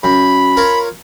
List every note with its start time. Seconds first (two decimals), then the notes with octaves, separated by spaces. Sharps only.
0.03 F#2 B5
0.57 F4 A#4 C#5